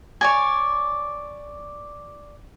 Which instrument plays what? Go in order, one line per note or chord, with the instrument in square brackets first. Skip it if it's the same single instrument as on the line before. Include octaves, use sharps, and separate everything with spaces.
[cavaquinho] C#5 D5 G#5